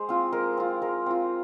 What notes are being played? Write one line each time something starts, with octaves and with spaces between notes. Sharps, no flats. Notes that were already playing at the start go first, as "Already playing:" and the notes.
Already playing: G#3 C5
C4 F4
G#3 A#4
C4 F4
G#3 A#4
C4 F4